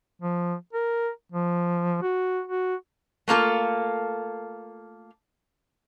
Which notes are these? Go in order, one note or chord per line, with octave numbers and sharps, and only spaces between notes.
F3
A#4
F3
F#4
F#4
A3 A#3 F4 A4